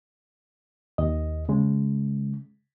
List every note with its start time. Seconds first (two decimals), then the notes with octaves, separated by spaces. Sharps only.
0.98 D#2 D#5
1.49 C#3 G#3